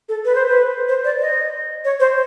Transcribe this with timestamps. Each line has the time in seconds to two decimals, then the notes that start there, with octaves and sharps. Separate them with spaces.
0.09 A4
0.25 B4
0.35 C5
0.47 B4
0.88 C5
1.04 D5
1.21 D#5
1.85 C#5
2.00 C5